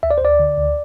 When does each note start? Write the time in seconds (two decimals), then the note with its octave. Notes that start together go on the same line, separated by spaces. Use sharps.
0.03 D2 E5
0.11 D5
0.18 C5
0.21 D2 D5
0.39 D3
0.58 D2